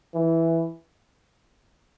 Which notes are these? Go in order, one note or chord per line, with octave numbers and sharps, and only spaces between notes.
E3